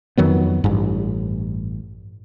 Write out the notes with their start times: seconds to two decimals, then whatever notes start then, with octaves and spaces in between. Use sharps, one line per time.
0.17 F2 D#3 F#3 B3
0.64 A1 G2